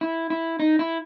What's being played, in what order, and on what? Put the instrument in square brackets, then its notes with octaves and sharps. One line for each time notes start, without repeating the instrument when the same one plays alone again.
[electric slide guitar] E4
E4
D#4
E4